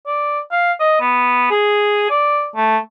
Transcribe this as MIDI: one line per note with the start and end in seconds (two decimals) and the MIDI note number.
0.07 0.40 74
0.52 0.72 77
0.80 1.00 75
1.01 1.51 59
1.51 2.09 68
2.10 2.48 74
2.56 2.78 57